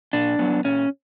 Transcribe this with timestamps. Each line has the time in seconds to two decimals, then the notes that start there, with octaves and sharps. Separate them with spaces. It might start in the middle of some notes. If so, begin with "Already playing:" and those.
0.13 A#2 D4
0.39 F#3 B3
0.64 A#2 C#4